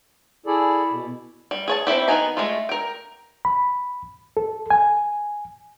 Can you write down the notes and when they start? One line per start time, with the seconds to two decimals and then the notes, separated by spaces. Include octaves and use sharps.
0.46 E4 G#4 A4 D5
0.91 B2
1.51 G3
1.68 G#4 C#5 A5
1.87 C4 D#4 E4 G4
2.08 D#3 B3 D#4 G#5 A#5
2.37 G#3 A3 F4
2.69 A#4 G5
3.45 B5
4.37 A4
4.70 G#5